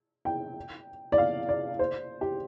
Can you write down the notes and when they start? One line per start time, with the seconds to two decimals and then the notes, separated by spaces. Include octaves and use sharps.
0.25 G5
1.12 D5
1.18 F5
1.49 D5
1.79 C5
2.21 G4